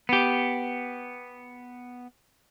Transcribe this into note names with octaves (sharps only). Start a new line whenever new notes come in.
B3 G4